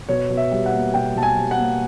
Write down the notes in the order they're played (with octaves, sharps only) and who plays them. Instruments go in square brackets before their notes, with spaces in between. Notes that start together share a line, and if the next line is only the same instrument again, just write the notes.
[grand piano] B2 C#5
B2
E5
G3
F#5
A#3
B2 G5
B2 A5
G#5
G3
F#5
A#3